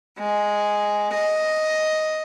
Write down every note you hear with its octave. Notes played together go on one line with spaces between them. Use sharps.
G#3
D#5